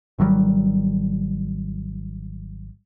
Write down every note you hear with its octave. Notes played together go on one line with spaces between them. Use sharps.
G#1 D#3 F#3 G3